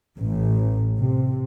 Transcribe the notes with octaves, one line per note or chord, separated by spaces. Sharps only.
A1
C3